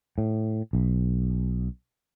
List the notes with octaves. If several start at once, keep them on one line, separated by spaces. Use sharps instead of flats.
A2
B1